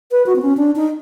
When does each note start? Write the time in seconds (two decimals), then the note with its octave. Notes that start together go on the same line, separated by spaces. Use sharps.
0.11 B4
0.26 F#4
0.36 C4
0.42 C#4
0.57 D4
0.76 D#4